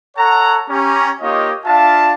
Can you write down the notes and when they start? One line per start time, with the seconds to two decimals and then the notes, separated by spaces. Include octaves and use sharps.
0.17 A4 C#5 F#5 A#5
0.69 C#4 G4 A#5
1.21 A#3 D#4 F4 G4 C#5 D#5
1.66 D4 F4 E5 F5 A5